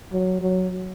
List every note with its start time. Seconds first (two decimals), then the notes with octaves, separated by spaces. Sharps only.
0.12 F#3
0.41 F#3